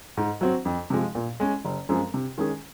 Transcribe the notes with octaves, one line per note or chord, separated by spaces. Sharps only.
G#2
F#3 C4 F#4
F2
C3 F3 G#3
A#2
G#3 C#4
F#1
F#2 F3 G#3 C4
C3
D#3 G#3 C#4 G#4